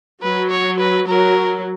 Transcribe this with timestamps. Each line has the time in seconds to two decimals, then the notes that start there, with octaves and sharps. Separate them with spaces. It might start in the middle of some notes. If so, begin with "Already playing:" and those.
0.23 F#3 B4
0.51 C#5
0.80 B4
1.08 F#3 A#4